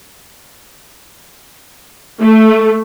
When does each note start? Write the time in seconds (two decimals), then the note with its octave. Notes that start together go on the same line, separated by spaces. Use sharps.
2.21 A3